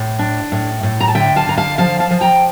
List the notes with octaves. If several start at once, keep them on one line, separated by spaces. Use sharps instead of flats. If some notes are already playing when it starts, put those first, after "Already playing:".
Already playing: A2
D4
A2
A2
A#5
A5
D3 E5 G5
F5 A5
D3 A#5
F5 A5
F3 F5 A5
F5 A5
F3
G5 A#5